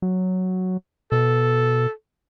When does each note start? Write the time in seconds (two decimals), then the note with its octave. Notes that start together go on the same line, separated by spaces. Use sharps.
0.02 F#3
1.12 B2 A4